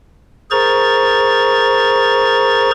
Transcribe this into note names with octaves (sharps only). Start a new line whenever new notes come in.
G#4 A#4 C5 A#5 C#6 A6